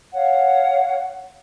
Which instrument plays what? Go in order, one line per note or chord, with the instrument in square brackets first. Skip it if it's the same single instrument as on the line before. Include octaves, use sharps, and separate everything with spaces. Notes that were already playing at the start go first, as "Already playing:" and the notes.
[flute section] C#5 F5 F#5